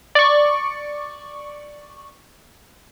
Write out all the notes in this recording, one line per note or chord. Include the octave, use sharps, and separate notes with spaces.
D5 C#6